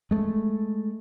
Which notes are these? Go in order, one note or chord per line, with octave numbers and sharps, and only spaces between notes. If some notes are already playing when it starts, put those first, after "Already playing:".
G#3 A3